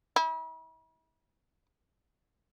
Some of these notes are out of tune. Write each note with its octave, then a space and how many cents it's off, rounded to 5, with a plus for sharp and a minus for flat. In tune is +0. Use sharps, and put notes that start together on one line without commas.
E4 -45